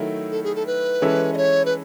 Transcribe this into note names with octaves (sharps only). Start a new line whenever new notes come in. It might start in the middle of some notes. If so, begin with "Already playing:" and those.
Already playing: D#3 F#3 A3 E4
A4
G#4
A4
B4
E3 G#3 C#4 E4 A4
D#5
C#5
B4